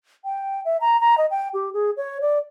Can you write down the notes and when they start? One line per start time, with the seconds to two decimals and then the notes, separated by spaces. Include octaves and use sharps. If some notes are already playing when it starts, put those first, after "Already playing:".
0.25 G5
0.65 E5
0.81 A#5
1.01 A#5
1.18 D#5
1.31 G5
1.54 G4
1.73 G#4
1.97 C#5
2.21 D5